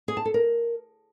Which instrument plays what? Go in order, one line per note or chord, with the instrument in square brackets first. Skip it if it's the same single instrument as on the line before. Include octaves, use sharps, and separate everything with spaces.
[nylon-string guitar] G#4
A5
A4
A#4